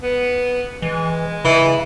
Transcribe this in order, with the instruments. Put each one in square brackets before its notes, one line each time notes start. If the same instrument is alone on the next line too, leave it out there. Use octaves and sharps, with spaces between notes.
[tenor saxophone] B3
[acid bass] E3 [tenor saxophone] G#3
[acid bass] C#3 [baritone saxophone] E3